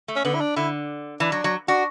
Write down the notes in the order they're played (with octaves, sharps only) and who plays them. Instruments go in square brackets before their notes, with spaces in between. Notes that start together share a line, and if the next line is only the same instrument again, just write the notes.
[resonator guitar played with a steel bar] A3
[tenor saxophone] C#4
[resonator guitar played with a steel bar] D3 [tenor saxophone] B3
[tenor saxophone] E4
D4
[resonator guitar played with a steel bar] D3 [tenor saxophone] E4
[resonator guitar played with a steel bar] E3 [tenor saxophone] D4
[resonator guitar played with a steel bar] F#3
F#3
[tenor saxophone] D4 [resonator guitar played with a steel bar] F#4